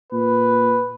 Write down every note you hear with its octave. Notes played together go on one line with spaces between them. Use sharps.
A#2 B4